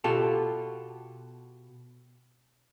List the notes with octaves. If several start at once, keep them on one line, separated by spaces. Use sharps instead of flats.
B2 F4 G4 A4